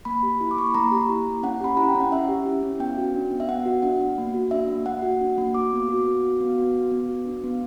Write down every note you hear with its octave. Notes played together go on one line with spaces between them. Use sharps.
A#3 B5
G4
E4
D6
A#3 C#6
B5
A#3 A#5
G4
E4
A#3
C#4 F#5
G4 B5
E4 A#5
G5
C#4
F#5
C#4 E5
G4
E4
C#4
B3 G5
F#4
D4
B3
E5
B3 F#5
F#4
D4 F#5
B3
A#3
F#4
D4 E5
A#3
A#3 F#5
F#4
D4
A#3
F#4 D6
B3
F#4
B3
F#4
B3
F#4
B3
B3
F#4
D4
B3